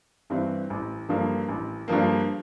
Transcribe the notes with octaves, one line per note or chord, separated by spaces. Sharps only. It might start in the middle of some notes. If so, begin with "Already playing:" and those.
G2 E3 G3 C4
A1
G2 D3 F3 A#3
A1
G2 D3 F3 A#3